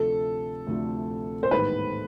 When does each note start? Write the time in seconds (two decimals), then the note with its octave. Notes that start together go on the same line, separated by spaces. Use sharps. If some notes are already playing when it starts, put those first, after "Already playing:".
Already playing: D2 C3 F3 A3 D4 A4
0.67 D2 C3 F3 A3 D4
1.43 C5
1.51 A1 G#2 D#3 G3 B3 B4